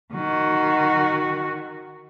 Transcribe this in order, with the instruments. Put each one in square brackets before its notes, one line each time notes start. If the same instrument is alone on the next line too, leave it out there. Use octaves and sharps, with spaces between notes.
[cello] D#3 F#4